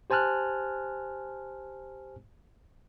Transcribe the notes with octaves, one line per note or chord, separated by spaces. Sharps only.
G4 C5 G#5 A5 F6 F#6